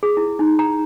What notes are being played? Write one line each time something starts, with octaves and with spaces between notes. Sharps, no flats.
G#4
E4
D#4
A#5